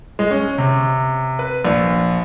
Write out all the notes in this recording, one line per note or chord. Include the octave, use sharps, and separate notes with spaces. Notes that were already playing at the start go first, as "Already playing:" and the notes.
G#3
C#4
C3
B4
A#1